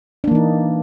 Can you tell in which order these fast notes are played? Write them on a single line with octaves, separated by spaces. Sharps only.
D4 A#3 E3 D#4